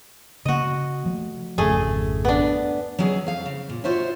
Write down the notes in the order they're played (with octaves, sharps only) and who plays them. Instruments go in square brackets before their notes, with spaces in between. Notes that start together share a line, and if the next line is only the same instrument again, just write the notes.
[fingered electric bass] C#3 A#3 [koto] F#4 D#5
[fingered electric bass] F3 A3
[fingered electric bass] G#1 F2 C#3 [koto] A3 G#4
[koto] B3 D4
[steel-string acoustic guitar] F#3 C#4 G#4 D#5 F5
F2 F5
C#3
A#2
F4 F#4 C5 C#5 D#5 E5